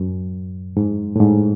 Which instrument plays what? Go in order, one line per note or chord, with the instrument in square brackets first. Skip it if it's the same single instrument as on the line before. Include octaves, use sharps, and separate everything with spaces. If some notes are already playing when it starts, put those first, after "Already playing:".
Already playing: [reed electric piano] F#2
G#2
A2
G#2